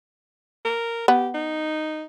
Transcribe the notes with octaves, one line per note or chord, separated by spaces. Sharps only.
A#4
B3 G4
D#4